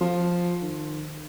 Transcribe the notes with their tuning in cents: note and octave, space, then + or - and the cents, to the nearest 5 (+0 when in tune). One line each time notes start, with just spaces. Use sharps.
F3 +5
D#3 -35